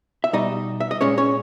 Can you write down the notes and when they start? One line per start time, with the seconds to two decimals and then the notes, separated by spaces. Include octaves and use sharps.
0.24 E5
0.33 B2 G3 D#4 D#5
0.80 E5
0.91 D#5
1.01 A#2 G#3 C#4 C#5
1.18 C#4 C#5